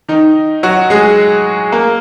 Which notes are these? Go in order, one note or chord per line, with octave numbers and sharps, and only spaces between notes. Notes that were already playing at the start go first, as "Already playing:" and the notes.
D#3 D#4
F#3 F#4
G#3 G#4
A#3 A#4